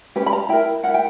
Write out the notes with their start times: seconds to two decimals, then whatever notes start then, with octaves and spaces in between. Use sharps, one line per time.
0.16 C#4 G4 B4
0.26 B5
0.33 A#5
0.49 E4 A#4 G5
0.83 E4 A#4 F#5
0.94 G5